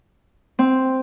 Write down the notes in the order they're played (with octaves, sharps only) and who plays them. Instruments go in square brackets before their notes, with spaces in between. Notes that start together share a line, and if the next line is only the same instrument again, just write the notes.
[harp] C4